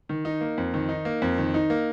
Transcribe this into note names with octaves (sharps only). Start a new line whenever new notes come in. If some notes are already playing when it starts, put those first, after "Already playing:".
D#3
D#4
A#3
F2
D#3
D#4
A#3
F2
D#3
D#4
A#3